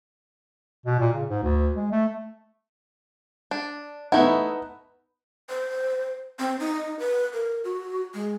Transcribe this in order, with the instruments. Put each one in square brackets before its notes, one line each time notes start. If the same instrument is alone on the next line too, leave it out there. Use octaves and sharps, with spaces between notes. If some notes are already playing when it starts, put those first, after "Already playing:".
[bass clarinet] B2
A#2
C#3
G#2
D2
G#3
A3
[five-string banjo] D4
[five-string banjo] A3 E4 [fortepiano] B3 D#4 F#5
[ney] C5
C4
D#4
B4
A#4
F#4
G#3